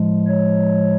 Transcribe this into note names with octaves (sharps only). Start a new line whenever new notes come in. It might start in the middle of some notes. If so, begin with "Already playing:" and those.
Already playing: A2 F3 G#3
C#5